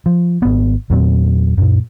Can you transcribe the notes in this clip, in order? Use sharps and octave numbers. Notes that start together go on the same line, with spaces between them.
F3
G#1 B3
E2 A#2 F#3 C4
F#2 A#2